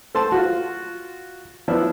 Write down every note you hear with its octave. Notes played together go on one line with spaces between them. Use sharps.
A4 C5 A5 C6
F4 F#4
F3 B3 D4 E4